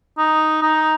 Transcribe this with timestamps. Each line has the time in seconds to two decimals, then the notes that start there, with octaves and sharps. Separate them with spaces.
0.18 D#4
0.62 D#4